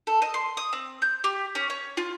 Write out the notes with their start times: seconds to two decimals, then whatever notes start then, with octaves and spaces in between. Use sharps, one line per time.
0.07 A4
0.22 D#5
0.34 C6
0.57 D#6
0.73 C4
1.02 G6
1.24 G4
1.55 C#4
1.70 C#5
1.97 F4